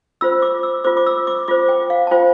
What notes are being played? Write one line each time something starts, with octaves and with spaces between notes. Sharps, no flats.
F4 C5 E6
D6
E6
F4 C5 D6
D6
E6
D6
F4 C5 D6
G5
F5
A5
F4 C5 G5